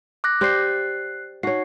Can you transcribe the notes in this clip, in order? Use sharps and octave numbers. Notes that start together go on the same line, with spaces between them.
D6 F#6 A#6
G4 C5 D5 F#6 C7
D#4 F#4 C#5 C7